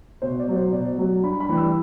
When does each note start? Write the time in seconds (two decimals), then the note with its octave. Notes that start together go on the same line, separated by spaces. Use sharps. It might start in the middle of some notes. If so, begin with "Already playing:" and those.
0.22 B2 C5
0.39 D5
0.48 F#3
0.56 C5
0.73 B2 D5
0.98 F#3
1.23 G2 B5
1.40 B5
1.49 E3 G3
1.57 E6